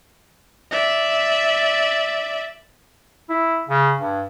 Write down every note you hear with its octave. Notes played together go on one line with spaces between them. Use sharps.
D5 E5
E4
C#3
G2